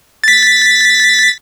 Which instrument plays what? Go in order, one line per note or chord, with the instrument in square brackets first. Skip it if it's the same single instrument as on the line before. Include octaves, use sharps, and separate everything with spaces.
[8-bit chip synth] A6 B6